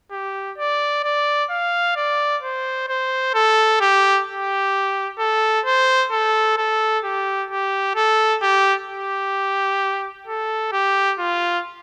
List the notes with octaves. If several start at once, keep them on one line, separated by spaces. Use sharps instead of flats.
G4
D5
D5
F5
D5
C5
C5
A4
G4
G4
A4
C5
A4
A4
G4
G4
A4
G4
G4
A4
G4
F4